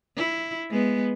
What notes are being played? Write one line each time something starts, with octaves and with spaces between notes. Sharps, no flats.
E4
G#3 B3